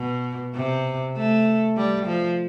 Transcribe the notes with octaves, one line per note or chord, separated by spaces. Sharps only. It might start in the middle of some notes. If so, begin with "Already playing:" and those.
Already playing: B2
C3
A3
G3
F3